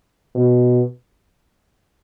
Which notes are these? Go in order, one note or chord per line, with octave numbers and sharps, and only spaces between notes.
B2